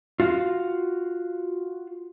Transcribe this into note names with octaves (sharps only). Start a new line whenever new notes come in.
F4 F#4 F5